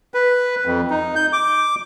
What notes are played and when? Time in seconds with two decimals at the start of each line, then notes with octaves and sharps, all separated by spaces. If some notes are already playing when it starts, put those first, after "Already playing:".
0.14 B4
0.65 F2
0.90 D#4
1.16 G6
1.33 D6